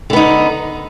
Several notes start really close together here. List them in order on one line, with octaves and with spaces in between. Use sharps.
D3 B3 D#4